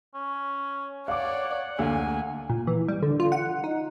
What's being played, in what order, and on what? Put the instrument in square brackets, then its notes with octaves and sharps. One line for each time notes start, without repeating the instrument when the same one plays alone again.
[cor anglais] C#4
[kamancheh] C#5 D5 [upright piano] F5 D6 [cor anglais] F#5
[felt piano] D2 A3 A#3 [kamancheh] G#5
[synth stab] A#2
E3
G3
D3
F4
F#5
D#4